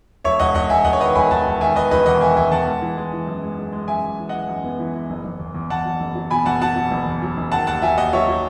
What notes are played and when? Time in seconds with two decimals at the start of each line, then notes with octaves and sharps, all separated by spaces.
0.24 E1 C#5 E5
0.40 E1 D#5 F#5
0.54 E1 D#5 F#5
0.69 E1 E5 G#5
0.85 E1 D#5 F#5
0.93 C#5
1.00 D#3 B4 D#5
1.15 E1 G#5 B5
1.30 E1 F#5 A5
1.46 E1
1.60 D#3 E5 G#5
1.75 E1 B4 D#5
1.91 E1 B4 D#5
2.06 E2 D#5 F#5
2.21 D#3 E5 G#5
2.37 E1 E5 G#5
2.52 E2 F#5 A5
2.67 G#3
2.82 E3
2.97 G#3
3.13 E3
3.27 F#2
3.43 G#3
3.58 G#3
3.73 G#3
3.88 F#2 E5 G#5
4.04 F#2
4.19 E3
4.29 D#5 F#5
4.34 E3
4.49 F#2
4.64 B3
4.80 E3
4.95 E3
5.10 F#1
5.25 F#1
5.39 E2
5.54 E2
5.70 E2 F#5 A5
5.85 F#3
6.00 F#1
6.15 F#3
6.30 B2 G#5 B5
6.46 F#1 F#5 A5
6.61 B2 F#5 A5
6.76 B2
6.91 F#1
7.06 E2
7.22 F#3
7.37 F#1
7.52 D#3 F#5 A5
7.67 D#2 F#5 A5
7.82 F#3 E5 G#5
7.98 D#2 D#5 F#5
8.13 F#3 C#5 E5
8.28 F#3